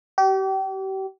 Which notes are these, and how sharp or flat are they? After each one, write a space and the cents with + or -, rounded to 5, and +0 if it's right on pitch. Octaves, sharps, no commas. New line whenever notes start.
G4 -35